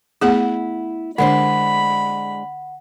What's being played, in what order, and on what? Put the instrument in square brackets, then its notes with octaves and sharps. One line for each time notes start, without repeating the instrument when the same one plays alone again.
[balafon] A3 B3 G#4 [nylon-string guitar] E4 F#5
[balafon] D3 [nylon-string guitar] G#3 D4 C5 [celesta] F#5 [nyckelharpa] B5